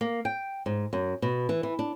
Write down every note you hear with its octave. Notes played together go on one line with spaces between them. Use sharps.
A#3
G5
G#2
F#2
B2
E3
E3
D4